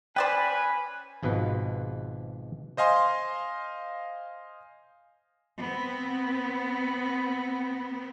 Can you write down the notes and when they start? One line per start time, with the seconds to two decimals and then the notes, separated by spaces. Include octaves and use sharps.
0.16 C#4 B4 C5 D5 G5 G#5 B5
1.23 G#1 G#2 B2 F3 B4
2.77 C5 D#5 F5 G#5 C6
5.61 B3 C4